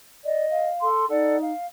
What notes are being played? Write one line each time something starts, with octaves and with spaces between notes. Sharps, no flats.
D5 D#5
F5
A4 C6
D#4 A4 D5 F#5
F5